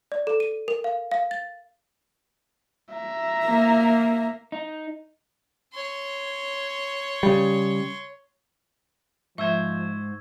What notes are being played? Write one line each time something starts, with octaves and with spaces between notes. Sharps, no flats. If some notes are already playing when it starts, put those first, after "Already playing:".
D5
A4
D#7
A#4
F5
F5
A6
E5 A#5
A#3
D#4
C#5 C6
C#3 G3
G#2 F3 C5 E5 C#6 E6 G#6